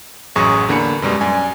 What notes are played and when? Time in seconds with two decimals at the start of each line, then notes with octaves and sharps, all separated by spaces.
0.36 A1 F#2 F#3 G#4 C#6 D#6
0.68 E2 D3 A#3 D4 B5 C#7
1.02 F#2 B2 G3 G#3
1.21 F#2 D5 G#5